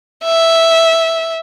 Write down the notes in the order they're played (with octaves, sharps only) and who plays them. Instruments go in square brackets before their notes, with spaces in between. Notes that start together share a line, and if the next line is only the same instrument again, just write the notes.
[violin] E5